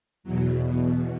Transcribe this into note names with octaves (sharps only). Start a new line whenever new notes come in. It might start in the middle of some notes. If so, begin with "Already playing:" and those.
E2 B2 F#3